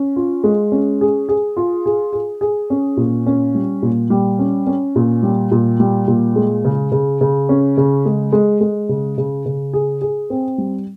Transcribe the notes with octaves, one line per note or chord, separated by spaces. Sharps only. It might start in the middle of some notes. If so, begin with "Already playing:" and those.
Already playing: C#4
F4
G#3
C#4
G#4
G#4
F4
G#4
G#4
G#4
C#4
A#2
C#4
G3
A#2
G3
C#4
C#4
A#2
G3
A#2
G3
A#2
G#3
C#3
C#3
C#3
C#4
C#3
G#3
G#3
G#3
C#3
C#3
C#3
G#4
G#4
C4
G3